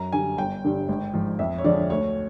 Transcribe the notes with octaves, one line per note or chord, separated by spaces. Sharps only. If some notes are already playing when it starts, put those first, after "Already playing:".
Already playing: F#2 A#5
D3 G3 G#5
G1 G5
G2 D3 G3
G#1
G#2 F3
F2 E5
C#5
D3 F3 G#3 D5
D2 C#5